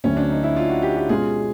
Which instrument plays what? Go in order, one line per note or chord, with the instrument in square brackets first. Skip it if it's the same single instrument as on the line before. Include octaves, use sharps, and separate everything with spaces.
[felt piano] D2 D3 F#3 A3 C4 [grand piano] C#4
[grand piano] D4
D#4
E4
F4
F#4
G4
G4
[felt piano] B2 G#3 C#4 F4 [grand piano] G#4